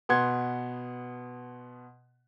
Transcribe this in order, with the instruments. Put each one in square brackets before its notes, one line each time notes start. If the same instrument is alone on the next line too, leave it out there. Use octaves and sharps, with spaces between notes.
[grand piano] B2 B3 F#5 C6 G#6